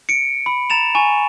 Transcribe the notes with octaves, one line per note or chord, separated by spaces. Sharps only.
C#7 D7
B5
A#5 A6 E7 F7
G#5 C#6